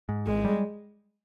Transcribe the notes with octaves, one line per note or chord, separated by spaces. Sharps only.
G#2
G#1 G#3
G3